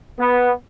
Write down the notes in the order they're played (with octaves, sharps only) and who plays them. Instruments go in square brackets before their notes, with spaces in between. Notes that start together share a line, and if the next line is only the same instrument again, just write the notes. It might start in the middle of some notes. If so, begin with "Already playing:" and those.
[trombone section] B3